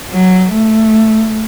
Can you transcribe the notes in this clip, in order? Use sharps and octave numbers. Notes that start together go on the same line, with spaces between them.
F#3
A3